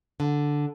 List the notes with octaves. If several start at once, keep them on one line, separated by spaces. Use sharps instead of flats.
D3